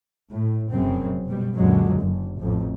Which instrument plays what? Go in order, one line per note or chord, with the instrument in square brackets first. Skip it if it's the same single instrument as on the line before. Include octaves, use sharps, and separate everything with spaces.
[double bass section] A2
F1 F#2 C#3 C4
B2 G3
C#2 F#2 A#2 D3 F#3 G#3
F#1
A1 F2